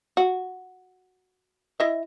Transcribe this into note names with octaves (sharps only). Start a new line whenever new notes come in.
F#4
E4 D#5 E5